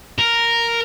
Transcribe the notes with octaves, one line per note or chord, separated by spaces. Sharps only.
A#4